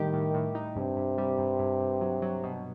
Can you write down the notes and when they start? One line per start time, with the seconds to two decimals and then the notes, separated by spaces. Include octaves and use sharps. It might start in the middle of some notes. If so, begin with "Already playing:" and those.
Already playing: A2 D#3 G3 G4
0.13 A2
0.34 A2
0.55 D#4
0.76 G2 C3
0.97 G2
1.18 G3
1.39 G2
1.59 G2
1.80 G2
2.01 F#3
2.22 F#3
2.44 B2